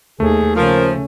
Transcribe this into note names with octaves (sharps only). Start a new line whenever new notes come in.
D#2 A3 G#4
C#3 F3 C#4 A#4